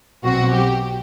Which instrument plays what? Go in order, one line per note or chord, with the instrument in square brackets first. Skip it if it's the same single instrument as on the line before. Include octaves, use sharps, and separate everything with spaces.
[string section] B1 B2 F#3 C4 F#4
G4